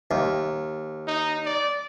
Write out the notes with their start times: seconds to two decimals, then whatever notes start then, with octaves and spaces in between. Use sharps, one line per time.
0.11 D#2
1.07 D#4
1.46 D5